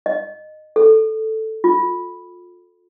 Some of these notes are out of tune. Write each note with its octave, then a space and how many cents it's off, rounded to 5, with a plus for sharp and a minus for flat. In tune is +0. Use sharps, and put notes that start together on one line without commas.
D#5 -15
A4 +0
F4 +20